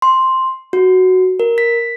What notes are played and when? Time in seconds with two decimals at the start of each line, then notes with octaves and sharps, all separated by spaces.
0.02 C6
0.73 F#4
1.40 A#4
1.58 B6